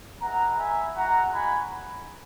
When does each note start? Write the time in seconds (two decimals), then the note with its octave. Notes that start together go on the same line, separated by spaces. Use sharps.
0.20 G#3 B3 E4 F#5 A#5
0.58 E5 G#5
0.96 G#3 D#4 F#4 F#5 A#5
1.34 G#5 B5